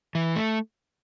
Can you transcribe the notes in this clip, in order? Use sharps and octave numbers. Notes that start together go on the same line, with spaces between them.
E3
A3